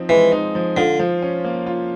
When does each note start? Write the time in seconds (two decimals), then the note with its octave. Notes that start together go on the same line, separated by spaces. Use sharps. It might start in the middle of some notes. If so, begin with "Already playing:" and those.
Already playing: F3 C4 D#4
0.09 E3 G#3
0.32 D#4
0.55 F3
0.77 D3 F4
0.99 F3
1.22 C#4
1.44 A#3
1.66 F4